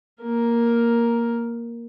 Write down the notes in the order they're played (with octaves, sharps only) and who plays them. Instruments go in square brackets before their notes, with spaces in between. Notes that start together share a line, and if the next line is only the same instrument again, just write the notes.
[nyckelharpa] A#3 A#4